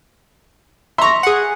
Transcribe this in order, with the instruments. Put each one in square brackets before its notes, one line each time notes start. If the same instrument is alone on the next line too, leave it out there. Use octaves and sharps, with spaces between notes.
[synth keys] E5 A#5 [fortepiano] C6 C#6
[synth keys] G#4 F#5